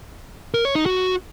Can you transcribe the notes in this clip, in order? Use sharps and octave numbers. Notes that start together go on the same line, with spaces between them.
A#4
C#5
D#4
F#4